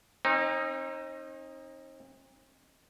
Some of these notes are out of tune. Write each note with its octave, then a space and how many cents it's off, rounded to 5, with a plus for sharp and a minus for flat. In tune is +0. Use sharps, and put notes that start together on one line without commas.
C4 +45 D#4 +0